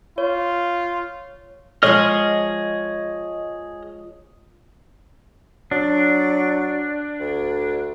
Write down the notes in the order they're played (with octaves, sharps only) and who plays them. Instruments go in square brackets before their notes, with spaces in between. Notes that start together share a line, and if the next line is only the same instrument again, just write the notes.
[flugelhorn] F4 [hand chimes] C#5
[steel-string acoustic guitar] F3 G#3 C#5 [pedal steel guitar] G#4 D#5 F6
[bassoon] F#3 [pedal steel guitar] D4
[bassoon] D2